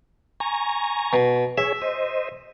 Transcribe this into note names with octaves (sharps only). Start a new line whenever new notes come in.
G#5 A#5 C#6
B2
G#4 C#5 E5
C5 D#5